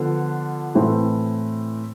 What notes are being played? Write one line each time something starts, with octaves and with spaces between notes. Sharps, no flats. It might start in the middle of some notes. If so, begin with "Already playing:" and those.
Already playing: D3 F3 B3
A2 E3 A3 C4